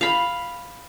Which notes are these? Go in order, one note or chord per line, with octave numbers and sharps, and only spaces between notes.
F5 B5